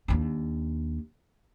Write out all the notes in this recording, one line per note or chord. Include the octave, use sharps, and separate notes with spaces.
D#2 D4